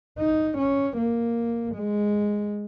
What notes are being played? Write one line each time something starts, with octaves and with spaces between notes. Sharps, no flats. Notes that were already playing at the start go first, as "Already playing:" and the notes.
D#4
C#4
A#3
G#3